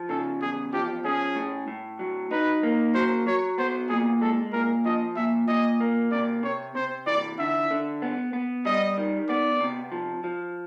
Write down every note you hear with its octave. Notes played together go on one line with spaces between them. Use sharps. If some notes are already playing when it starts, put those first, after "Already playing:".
Already playing: F3
C#3 A4
E2 G#4
F3 G4
C#4 G#4
A2
A2
F#3
D#4 B4
A#3
F#3 C5
F#3 C#5
B3 C5
A#2 G#4
G#3 A4
A#2 A#4
F3 D#5
A#2 E5
A#2 D#5
A#3
C3 D5
C3 C#5
C3 C5
E3 D5
D3 E5
D3
B3
B3
G3 D#5
D#3
B3 D5
C3
F3
F3